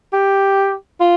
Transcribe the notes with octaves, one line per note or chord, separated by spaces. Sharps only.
G4
F4